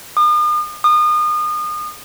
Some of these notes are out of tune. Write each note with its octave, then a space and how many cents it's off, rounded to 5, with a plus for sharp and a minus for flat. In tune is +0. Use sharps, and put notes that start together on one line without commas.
D#6 -45
D#6 -35